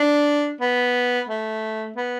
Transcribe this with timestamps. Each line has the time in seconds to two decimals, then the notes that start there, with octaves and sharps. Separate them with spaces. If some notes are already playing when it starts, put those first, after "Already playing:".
Already playing: D4
0.61 B3
1.29 A3
1.96 B3